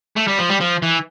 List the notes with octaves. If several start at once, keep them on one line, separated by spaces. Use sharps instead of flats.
A3
G3
F3
G3
F3
E3